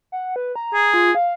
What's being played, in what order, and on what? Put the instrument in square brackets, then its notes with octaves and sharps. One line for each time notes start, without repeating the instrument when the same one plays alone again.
[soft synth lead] F#5
B4
A#5
[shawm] G#4
[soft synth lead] F4
F5